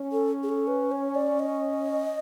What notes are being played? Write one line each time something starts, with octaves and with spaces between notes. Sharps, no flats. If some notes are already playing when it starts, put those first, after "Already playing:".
Already playing: C#4
A4
G#4
A4
B4
C#5
D5
D#5